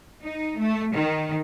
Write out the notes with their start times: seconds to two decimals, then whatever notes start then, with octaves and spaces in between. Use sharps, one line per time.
0.23 D#4
0.58 A3
0.95 D#3